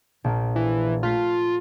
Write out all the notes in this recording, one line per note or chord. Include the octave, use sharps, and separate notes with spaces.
A#1 A#3
E3
A3 F4 B6